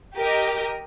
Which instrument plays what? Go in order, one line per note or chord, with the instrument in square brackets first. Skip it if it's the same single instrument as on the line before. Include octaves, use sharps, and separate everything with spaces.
[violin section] G4 A#4 D#5